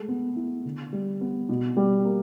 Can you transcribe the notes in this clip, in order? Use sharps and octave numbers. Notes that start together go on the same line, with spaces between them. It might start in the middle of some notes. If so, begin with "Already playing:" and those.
Already playing: G#3 A3
B3
E4
D3
G3
B3
B2
G3
A#3